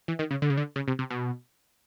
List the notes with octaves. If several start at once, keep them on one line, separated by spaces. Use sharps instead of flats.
E3
D#3
C#3
D3
C#3
D3
C#3
C3
C3
B2